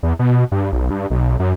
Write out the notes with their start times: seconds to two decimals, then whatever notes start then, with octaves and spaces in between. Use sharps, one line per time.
0.03 E2
0.19 B2
0.52 G2
0.72 B1
0.90 G2
1.10 B1
1.40 F#2